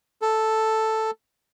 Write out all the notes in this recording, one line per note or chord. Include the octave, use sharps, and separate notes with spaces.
A4